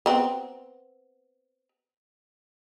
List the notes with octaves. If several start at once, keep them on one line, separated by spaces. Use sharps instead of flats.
B3 C4